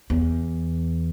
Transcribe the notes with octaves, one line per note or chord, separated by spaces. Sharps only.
E2